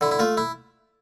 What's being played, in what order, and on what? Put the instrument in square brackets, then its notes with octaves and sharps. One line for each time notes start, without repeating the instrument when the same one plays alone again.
[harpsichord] D3 E4
E4
A3 F4
E4